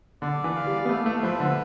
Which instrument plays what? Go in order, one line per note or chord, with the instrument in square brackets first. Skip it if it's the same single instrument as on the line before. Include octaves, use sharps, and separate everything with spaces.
[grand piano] D3 [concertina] D5
[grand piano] E3
[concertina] F5
[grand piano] G3
B3
[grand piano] A3 [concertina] E4
[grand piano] A3
[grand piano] F3 [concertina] B4
[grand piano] D3